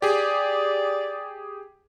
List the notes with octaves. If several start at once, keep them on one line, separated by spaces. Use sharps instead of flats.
G4 G#4 D5